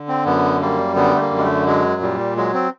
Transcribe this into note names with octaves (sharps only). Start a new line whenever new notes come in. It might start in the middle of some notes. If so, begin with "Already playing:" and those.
Already playing: D3
C4
F#2 B3
G3 A#3
D3 B3
A3
A#3
F#2
G#3
A3
F#3 G#3
A#2 G3
F#3 G#3
C4